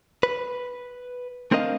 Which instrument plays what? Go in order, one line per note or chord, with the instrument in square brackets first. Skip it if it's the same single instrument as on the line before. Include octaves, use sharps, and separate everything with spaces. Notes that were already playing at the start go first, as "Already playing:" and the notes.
[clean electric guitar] B4
A3 C4 D4 A#4 D#5 F5